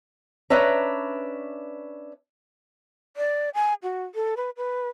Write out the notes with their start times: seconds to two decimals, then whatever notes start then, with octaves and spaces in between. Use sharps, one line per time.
0.50 C#4 D4 B4 E5 A#5
3.17 D5
3.55 G#5
3.83 F#4
4.15 A4
4.37 B4
4.57 B4